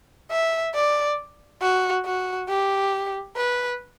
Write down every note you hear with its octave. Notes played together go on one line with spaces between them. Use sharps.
E5
D5
F#4
F#4
G4
B4